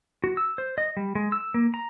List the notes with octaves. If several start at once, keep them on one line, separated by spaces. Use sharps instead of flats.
F#4
E6
C5
D#5
G3
G#3
E6
A#3
A#5